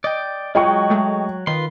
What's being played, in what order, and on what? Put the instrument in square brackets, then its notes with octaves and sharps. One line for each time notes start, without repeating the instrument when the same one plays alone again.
[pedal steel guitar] D5 G5 [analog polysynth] D#5
[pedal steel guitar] F#3 [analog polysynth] G#3 F4 G#4 [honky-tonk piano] D#5 G5 C#6
[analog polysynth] G#3 A3
[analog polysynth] D#3 [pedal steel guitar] F4 B4 C6